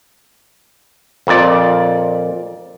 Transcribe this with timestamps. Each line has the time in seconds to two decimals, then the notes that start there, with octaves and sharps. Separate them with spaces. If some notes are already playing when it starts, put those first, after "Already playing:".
1.27 F2 A#2 D5